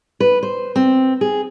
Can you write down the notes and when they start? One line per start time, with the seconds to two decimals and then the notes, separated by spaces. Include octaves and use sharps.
0.20 B4
0.43 C5
0.76 C4
1.21 G#4